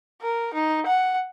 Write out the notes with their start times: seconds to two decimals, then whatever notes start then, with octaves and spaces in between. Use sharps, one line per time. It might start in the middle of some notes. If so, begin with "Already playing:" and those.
0.22 A#4
0.54 D#4
0.87 F#5